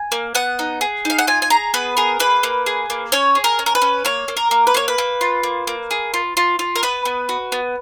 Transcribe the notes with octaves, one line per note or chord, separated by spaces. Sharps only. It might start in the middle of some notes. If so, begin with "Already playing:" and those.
Already playing: G#5
A#3
B3 F#5
D#4
G#4
D#4 F5
F#5
F4 G#5
G#5
G#4 A#5
B3 B4
G#4 A#4
A#3 B4
A#3
G#4
A#3
C#4 C#5
G#4
A#4
C#4
A#4
B4
C#4
A#3 C#5
A#3
A#4
A#3
B4
A#3 C#5
B4
A#3
F4
A#3
A#3
G#4
F4
F4
F4
A#4
B3 B4
B3
F#4
B3